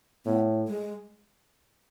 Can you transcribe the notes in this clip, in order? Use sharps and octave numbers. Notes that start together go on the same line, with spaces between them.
A2 B3
G#3